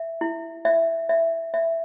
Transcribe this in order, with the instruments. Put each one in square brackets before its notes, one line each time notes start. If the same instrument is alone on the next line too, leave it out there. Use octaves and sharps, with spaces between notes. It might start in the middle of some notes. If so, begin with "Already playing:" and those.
Already playing: [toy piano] E5
E4
E5
E5
E5